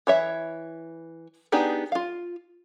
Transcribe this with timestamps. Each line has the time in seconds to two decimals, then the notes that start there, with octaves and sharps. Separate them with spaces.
0.07 E3 C#5 E5
1.52 B3 D4 D#4 G4 G#4
1.92 F4 F5